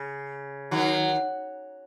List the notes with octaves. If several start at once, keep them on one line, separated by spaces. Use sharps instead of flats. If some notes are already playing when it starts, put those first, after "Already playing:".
Already playing: C#3
D#3 F#3